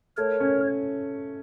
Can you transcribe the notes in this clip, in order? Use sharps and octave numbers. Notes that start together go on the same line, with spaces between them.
A3 A#4 C#5
C#4